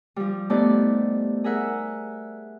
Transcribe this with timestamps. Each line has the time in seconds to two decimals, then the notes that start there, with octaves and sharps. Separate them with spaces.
0.16 F3 G3
0.50 A3 B3 D#4 G4 C5 D5
1.44 G#4 A#4 E5 F#5